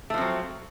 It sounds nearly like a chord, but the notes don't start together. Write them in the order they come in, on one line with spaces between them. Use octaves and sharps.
A3 F3 C4 F#3